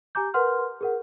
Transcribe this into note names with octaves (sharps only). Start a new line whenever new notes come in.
G4 G#5 A#5 D6 G6
A#4 B4 F#5 C6 F6
G#4 A#4 F#5